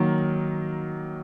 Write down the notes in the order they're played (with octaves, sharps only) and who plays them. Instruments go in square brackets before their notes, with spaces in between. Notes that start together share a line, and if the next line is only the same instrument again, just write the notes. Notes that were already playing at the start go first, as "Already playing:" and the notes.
Already playing: [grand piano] D#3 F#3 A#3